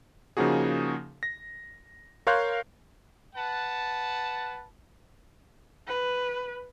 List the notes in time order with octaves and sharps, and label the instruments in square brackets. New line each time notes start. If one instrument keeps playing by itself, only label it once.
[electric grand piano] C#3 F3 A#3 D#4 F#4 G#4
A#6
A#4 C#5 F5 C6 F#6 G6
[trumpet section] B4 F#5 A5
[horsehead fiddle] B4